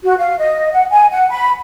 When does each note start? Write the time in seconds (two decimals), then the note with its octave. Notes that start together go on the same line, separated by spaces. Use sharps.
0.04 F#4
0.18 F5
0.39 D#5
0.73 F#5
0.91 G#5
1.12 F#5
1.31 B5